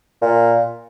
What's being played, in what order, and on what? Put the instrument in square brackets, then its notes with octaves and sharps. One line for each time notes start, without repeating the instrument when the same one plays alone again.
[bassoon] A#2